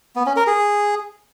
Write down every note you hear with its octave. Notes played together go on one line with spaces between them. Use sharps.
B3
C#4
A#4
G#4